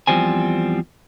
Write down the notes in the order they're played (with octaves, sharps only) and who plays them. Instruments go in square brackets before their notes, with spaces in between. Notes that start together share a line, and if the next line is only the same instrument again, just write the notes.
[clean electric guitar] E2 F3 G3 C4 G#5